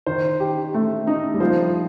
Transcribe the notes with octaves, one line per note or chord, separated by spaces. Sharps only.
D#3 C5
G4
A3
D#4
G3
F3 C5